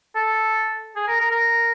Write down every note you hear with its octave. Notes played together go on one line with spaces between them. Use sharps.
A4
G#4
A#4
A#4
A#4